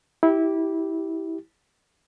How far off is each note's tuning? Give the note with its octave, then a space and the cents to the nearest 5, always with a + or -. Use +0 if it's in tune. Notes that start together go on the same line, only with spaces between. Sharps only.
E4 -20 G4 -10